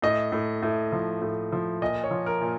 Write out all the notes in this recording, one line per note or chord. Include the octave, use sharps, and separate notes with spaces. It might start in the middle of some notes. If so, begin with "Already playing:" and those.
A2 D#5
A2
A2
F3
A2
F3
A#2 D#5
C#5
F3
A#4
A#2